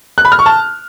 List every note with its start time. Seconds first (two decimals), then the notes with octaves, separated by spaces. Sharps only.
0.18 F#6
0.25 B5
0.32 F6
0.39 C#6
0.46 A5